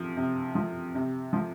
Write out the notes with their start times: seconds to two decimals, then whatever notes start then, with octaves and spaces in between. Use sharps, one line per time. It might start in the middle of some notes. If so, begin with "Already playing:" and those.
Already playing: C3 F3
0.17 C3
0.55 F3
0.95 C3
1.33 F3